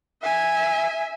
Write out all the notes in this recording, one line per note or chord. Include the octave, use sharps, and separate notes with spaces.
E5 G#5